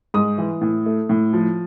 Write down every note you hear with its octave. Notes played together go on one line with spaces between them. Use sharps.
G#2 D#6
E3
A2
A3
A2
F3